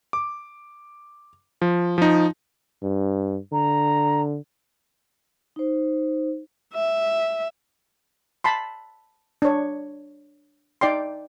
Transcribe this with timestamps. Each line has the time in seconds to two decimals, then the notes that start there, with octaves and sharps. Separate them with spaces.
0.13 D6
1.62 F3
1.98 F3 D#4
2.82 G2
3.52 D3 A#5
5.56 D#4 C5
6.74 E5
8.44 A5 B5 C6
9.42 D4 C#5
10.81 D#4 D5 G5 C6